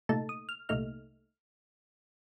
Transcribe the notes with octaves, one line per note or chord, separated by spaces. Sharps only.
C2 A#2 A3 D#4 A5
D#6
F6
C2 A#2 A3 D#4 F6